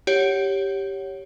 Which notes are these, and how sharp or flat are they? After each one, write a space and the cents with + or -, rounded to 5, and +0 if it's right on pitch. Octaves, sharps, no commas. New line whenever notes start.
G4 +0 C#5 +0 F#5 +15